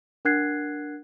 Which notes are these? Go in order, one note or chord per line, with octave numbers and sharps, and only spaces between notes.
D4 A#4 F#5 F#6 G#6 C7